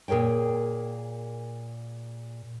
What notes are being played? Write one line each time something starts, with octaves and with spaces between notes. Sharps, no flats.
A#2 G#4 A#4 C#5 G5